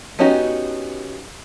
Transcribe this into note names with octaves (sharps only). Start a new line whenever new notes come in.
B3 C#4 D#4 F#4 G4